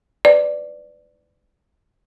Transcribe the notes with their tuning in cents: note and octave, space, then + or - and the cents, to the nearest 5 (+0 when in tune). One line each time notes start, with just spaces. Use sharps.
B4 +30 D5 +0